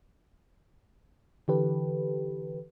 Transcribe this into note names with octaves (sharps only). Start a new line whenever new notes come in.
D3 E3 G4 A4 B4